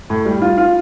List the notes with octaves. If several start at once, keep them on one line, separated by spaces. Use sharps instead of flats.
A2
G3
F4
F4